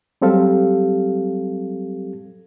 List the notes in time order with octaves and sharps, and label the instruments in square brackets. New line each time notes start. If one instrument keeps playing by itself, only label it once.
[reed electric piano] F#3 G3 C4 G4 A4 F5